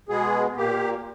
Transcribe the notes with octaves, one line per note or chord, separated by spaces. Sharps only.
B2 G#3 B3 G#4
A#2 A#3 G4